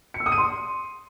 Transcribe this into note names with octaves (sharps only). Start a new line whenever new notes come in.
C#7
E6
D#6
D#7
C6